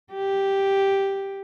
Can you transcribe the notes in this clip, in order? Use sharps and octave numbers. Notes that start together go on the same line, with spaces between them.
G4